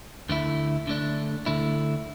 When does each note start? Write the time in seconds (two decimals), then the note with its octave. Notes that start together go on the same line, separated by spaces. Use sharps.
0.29 D2 D3 A3 E4
0.87 D3 A3 D4
1.46 D2 D3 A3 E4